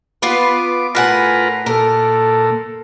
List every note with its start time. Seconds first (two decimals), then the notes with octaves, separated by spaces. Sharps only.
0.22 B3 F4 B4 D6
0.95 A2 F4 A#4 B4 F#5 G#5
1.66 A#2 A4 A#4